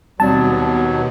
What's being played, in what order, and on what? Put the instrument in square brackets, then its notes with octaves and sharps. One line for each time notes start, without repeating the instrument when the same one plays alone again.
[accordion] D#2 F#3 [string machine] B2 [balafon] G3 C4 D5 [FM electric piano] A5